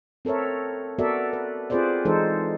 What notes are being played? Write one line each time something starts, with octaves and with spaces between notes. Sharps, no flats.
C4 A4 A#4 C#5 E5
B3 F#4 A4 A#4 D5 E5
B4
C4 F4 G#4 B4 C5 D5
E3 G#3 D#4 A4 C5